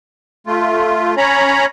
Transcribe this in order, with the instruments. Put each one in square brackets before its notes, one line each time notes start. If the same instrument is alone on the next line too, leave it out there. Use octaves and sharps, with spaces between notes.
[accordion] A3 F4
C#4 C#5 A#5 B5